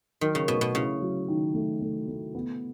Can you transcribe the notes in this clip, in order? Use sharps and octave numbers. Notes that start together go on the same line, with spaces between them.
D#3 F#3
C#3
B2 A3
B2
C#3 E4
F#3
D#3
A3
A3
A3
B3